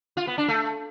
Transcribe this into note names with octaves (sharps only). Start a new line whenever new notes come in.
F4
B3
D4
A3